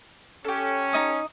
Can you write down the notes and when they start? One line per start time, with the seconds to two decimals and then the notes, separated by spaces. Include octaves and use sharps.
0.45 C#4 G4 A4
0.93 D#4 D#5 D#6